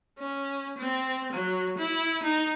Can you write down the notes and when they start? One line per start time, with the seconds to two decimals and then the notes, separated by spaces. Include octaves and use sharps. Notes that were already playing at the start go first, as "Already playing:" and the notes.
0.19 C#4
0.78 C4
1.33 F#3
1.78 E4
2.23 D#4